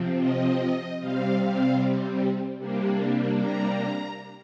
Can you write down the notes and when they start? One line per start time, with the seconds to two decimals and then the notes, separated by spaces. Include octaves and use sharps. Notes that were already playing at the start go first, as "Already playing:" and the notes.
Already playing: C3 F3 C4
0.20 D#5
0.99 C3 G3 C4 F5
1.39 F5
2.58 C3 G3 A#3 D4
3.37 A#5